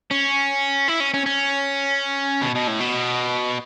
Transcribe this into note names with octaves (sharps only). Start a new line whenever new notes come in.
C#4
E4
C#4
C#4
C#4
B2
B2
A2
B2